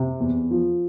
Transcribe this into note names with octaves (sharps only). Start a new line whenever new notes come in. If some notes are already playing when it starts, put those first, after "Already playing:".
Already playing: C3
E2
F3